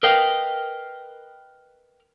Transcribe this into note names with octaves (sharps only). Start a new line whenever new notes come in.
A#4 B4 D#5 F5 G5